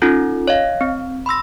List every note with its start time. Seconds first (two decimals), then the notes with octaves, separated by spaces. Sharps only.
0.02 C#4 D#4 F4 A4
0.48 C#5 D#5 F5
0.81 C4
1.26 B5 C6 E6 A#6